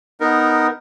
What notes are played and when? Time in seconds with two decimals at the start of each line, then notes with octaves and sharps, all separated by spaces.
0.20 B3 D#4 A#4